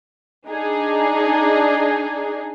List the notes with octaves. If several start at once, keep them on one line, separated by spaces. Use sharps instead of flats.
D4 D#4 G#4